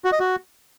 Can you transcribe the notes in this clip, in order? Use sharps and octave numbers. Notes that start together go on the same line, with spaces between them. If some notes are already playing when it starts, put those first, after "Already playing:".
F#4
D#5
F#4